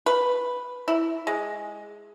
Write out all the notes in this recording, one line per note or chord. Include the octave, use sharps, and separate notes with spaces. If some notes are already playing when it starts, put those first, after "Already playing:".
B4
E4
G#3